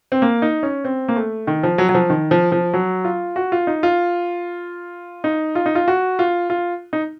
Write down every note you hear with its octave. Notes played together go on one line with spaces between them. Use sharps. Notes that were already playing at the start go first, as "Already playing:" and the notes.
C4
A#3
D#4
C#4
C4
A#3
A3
D#3
F3
F#3
F#3
F3
D#3
F3
F3
F#3
F4
F#4
F4
D#4
F4
D#4
F4
D#4
F4
F#4
F4
F4
D#4